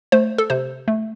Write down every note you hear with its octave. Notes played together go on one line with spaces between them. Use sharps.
A3 C5
A4
C3 C5
A3